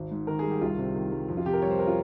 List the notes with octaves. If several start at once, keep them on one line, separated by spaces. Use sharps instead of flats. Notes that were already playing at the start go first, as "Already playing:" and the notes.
Already playing: G#1
G#2
D#3 A#4
G3 G#4
G4
C2 F4
C3
D#3
G3
F2
F4
C3 G4
A#4
G3 C#5
C5
A#4
F4